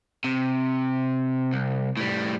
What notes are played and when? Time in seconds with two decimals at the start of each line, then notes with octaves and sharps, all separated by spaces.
0.24 C3
1.53 C2
1.97 A2 G3